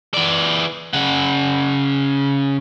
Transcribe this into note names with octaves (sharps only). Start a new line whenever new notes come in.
E3 D5
C#3 F#5